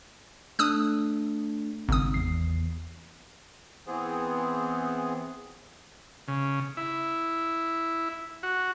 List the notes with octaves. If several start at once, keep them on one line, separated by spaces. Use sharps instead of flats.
A3 D4 D#6 E6 F#6
G#1 C#3 D#6
E2 C7
E3 B3 C4 G#4
C#3
E4
F#4